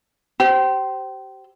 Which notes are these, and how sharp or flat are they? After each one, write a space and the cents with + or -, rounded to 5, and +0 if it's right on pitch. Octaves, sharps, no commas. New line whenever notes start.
G4 -30 C5 +0